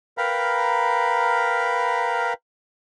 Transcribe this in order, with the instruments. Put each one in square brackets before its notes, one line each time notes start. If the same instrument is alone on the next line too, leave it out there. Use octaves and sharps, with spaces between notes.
[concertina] A#4 B4 F5 G5 A#5 B5